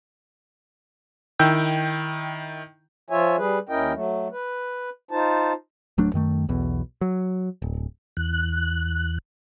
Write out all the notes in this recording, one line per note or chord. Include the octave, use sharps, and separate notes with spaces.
D#3 E4 G5 E6 G6
F3 F4 C#5 E5 G#5
G3 G#4 B4
D#2 C#4 E4 A#4 D#5 G5
F#3 A3
B4
D#4 F4 C5 A5
D1 F#3 A3 D4
F#2 D#3 A3
B1 E2 B2
F#3
D1
E2 F#6